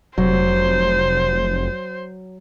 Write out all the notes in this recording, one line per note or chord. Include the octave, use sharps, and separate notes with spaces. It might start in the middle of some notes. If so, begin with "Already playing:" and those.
F1 F#3 C5